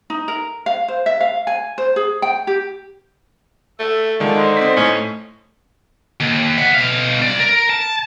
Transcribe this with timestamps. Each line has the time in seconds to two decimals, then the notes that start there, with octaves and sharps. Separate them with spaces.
0.10 D#4
0.28 A#4
0.66 F5
0.88 C5
1.06 E5
1.21 F5
1.47 G#5
1.78 C5
1.96 G#4
2.22 G5
2.47 G4
3.80 A3 E5
4.20 D3 D#3 G#3 F4 A4
4.34 D#4 C5 D#5
4.57 C4 C6 B6
4.77 A2 A3 C#4
6.20 D#2
6.58 E5 F#5
6.74 B2 F5
7.21 C2 D5
7.40 A#4
7.70 A5